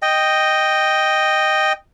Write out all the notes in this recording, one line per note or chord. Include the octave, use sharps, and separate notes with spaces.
D#5 G5